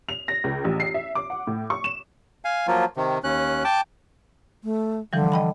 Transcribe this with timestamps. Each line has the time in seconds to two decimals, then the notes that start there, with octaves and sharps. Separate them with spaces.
0.09 F7
0.28 A#6
0.44 C#2
0.65 A1
0.80 C7
0.94 E5
1.15 D6
1.30 F#5
1.47 A2
1.70 C#6
1.84 E7
2.45 F5 G#5
2.67 F3 F#3 A#3 F4
2.96 C3 D#3
3.24 D#2 C#4 F#6
3.64 G5 A5 D6
4.64 A3
5.13 D3 E3 F3 G3
5.32 D#5 G5 B5